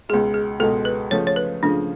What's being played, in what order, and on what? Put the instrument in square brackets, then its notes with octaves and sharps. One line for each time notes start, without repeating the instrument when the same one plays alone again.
[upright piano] C#2 B2 G#3 [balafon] G#4
[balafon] G#4
[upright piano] C#2 B2 G#3 [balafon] A4
[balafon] B4
[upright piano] C#3 F3 A3 [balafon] C#5
[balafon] C#5
B4
[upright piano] C#3 F3 A3 [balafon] D4